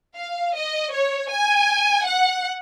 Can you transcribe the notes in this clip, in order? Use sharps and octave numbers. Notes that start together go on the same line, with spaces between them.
F5
D#5
C#5
G#5
F#5